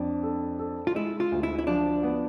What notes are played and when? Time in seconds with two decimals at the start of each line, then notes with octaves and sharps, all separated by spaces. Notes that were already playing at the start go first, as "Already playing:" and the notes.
Already playing: F2 D4
0.23 A4
0.59 A4
0.87 F4
0.95 G#3 E4
1.20 F4
1.32 D2
1.43 E4
1.59 E4
1.67 F3 D4
2.03 B3